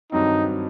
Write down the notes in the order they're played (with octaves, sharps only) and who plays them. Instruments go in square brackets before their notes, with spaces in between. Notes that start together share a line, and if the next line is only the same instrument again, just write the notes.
[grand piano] G2 D#3 F#3 C4 [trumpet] D#4